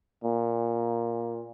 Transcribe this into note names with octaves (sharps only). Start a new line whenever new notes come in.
A#2